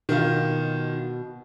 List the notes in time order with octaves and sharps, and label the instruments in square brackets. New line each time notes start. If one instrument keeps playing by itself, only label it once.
[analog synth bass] B2 [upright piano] D#3 F4